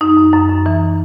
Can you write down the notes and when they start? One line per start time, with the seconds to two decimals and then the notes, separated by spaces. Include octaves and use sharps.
0.01 F#2 D#4
0.17 F#2
0.33 F#2
0.50 F#2
0.66 E3